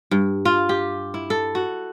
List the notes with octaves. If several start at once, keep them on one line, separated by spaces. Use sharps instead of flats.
G2
F4
G4
E4
A4
F#4